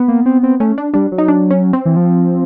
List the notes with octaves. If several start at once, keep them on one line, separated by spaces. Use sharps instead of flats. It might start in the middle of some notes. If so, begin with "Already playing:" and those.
Already playing: B3
A#3
C4
C4
A3 C#4
D4
G3 D4
F#3
D#4
D4
C#4
C4
E3
F3